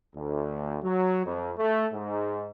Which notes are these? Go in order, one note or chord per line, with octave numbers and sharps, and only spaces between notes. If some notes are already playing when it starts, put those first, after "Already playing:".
D2
F#3
F2
A3
G#2